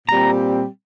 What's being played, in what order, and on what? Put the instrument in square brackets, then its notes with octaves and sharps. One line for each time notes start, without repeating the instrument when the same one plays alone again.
[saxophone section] A#2 G3 C4 G4 [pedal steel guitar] A#5